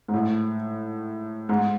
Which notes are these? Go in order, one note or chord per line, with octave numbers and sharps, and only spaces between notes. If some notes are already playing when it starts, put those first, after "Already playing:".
G#2
A2
G#2